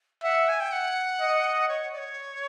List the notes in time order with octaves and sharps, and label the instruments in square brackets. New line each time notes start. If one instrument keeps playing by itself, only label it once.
[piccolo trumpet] E5 [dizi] F#5
[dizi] G#5
G5
F#5
[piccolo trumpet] D#5
[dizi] C#5
D5
C#5